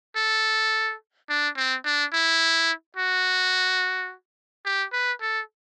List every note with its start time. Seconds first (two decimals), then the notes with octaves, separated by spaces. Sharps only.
0.16 A4
1.29 D4
1.57 C4
1.85 D4
2.13 E4
2.97 F#4
4.65 G4
4.93 B4
5.21 A4